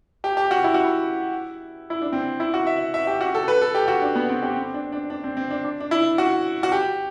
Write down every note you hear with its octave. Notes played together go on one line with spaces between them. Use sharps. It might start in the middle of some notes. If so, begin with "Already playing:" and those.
G4
G4
F#4
E4
F#4
E4
E4
D4
C4
E4
F#4
E5
E5
G4
F#4
A4
B4
A4
G4
F#4
D4
B3
C4
G4
C4
D4
D4
D4
C4
C4
D4
D4
D4
E4
F#4
F#4
G4